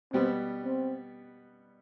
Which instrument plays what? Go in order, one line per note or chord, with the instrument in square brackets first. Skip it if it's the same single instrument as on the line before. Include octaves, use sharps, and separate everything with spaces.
[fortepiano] B2 G3 B3 [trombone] C4
[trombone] C4